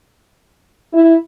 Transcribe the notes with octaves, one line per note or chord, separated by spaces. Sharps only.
E4